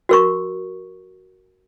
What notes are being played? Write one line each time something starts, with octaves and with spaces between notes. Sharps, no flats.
F#4 A#4 C#6